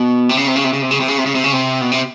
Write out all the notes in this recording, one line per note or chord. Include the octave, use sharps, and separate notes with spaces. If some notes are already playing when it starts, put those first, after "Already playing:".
Already playing: B2
C3
C#3
C3
C#3
C3
C#3
C3
C#3
C3
C#3
C3
C#3
C3
C#3
C3
B2
C3